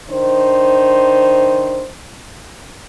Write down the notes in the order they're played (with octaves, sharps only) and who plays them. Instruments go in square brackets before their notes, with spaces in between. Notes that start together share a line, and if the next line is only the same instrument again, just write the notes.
[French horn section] D#3 D4 C5